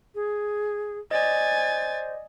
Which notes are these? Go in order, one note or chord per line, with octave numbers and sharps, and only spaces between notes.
G#4
C5 D5 D#5 G#5 A6